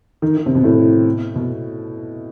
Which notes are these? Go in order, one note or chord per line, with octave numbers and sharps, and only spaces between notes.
D#3
D#3
C3
B2
A2
B2